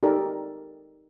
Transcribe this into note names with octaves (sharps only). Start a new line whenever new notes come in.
D#4 G4 A4 A#4 D5